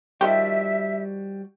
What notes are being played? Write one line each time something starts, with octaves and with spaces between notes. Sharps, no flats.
D#3 F3 G3 F#4 G4 E5